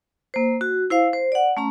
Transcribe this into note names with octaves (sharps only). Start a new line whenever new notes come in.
A#3 C5
F#4
E4 C5 F5
C5
D5 F#5
A3 C#4 A#5